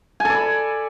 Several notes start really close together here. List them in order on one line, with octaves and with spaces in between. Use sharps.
G#5 A4 D5 B5